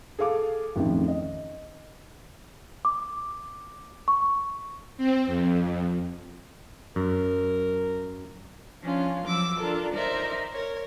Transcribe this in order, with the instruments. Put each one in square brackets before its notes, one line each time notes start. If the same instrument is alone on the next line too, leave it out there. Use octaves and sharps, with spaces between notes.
[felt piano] G#4 A4 F5 D6
A1 F2 D#3
D#5
[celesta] D6
C#6
[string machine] C4
F2
[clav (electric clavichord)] F#2 [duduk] A#4
[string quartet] F3 C#4 D4 F4
F3 F#3 D6 E6
D4 F4 A4 A#4
D#4 A#4 C5 D5 E5
A#4 C#5